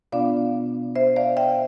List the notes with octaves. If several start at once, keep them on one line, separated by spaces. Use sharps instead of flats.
B2 B3 D4 F4 D5 F5
C5 E5
D5 F5
E5 G5